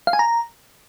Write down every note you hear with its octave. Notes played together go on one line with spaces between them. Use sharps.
F5
G#5
A#5